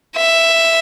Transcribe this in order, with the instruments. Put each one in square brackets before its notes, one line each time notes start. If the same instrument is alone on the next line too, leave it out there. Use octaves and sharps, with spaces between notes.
[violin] E5